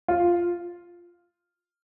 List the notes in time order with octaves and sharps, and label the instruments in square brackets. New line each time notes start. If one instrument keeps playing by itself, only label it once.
[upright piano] F4